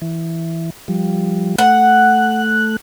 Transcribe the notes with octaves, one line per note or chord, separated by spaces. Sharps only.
E3
F3 G3
A3 F#5 F#6